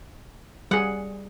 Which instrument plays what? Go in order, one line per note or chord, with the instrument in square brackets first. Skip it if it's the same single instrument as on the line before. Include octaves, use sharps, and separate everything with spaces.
[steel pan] G3 G#4 [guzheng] F#5